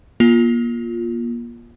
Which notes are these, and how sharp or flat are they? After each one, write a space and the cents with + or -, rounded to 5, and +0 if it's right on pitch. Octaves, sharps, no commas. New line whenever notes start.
A#3 +35 F4 +0